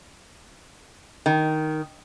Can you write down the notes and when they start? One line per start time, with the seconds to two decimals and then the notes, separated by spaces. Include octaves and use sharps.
1.26 D#3